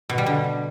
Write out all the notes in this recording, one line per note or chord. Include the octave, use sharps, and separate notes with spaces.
B2
G3
D3